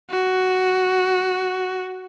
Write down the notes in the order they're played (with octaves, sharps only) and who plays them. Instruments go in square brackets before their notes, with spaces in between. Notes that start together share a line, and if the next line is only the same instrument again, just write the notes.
[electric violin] F#4